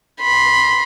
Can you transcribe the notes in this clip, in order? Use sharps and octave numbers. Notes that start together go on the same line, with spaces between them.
B5 C6